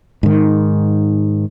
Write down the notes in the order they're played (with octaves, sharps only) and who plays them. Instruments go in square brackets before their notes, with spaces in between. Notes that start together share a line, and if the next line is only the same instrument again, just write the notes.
[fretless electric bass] G#2 D#3